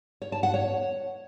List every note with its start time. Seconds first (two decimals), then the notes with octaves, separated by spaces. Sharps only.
0.22 C#5
0.32 A5
0.43 F#5
0.54 C#5